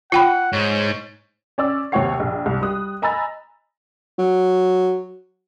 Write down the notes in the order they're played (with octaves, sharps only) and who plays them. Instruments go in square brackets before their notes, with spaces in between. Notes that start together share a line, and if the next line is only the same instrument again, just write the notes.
[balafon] F4 G5 B5 [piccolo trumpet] F#5
[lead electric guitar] G#2 [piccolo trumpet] C#5
[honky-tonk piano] C#4 D5 E6
D#2 C3 C4 C#5 F#5 C7
A#1
C2
G3 D#6 F#6
D#5 G#5 A#5 B5 E6 A6
[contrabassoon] F#3